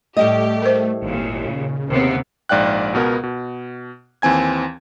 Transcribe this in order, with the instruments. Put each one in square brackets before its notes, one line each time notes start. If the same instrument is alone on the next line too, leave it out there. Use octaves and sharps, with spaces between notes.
[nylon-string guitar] A2 G3 D#5 [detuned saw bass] A3 [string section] G4
[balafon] A#4 C5
[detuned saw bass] G#1 [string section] D#2 A#2
[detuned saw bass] C#3
[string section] D#2 C3 B3
[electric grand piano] A#1 G#2 D5 F5 G5 F#6
C#2 B2 B3 A#4
B2
D#2 E3 C4 G#5 G#6